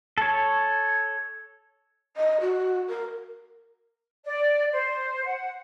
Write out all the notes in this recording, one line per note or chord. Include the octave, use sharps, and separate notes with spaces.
A4 C#5
D#5
F#4
A#4
D5
C5
F#5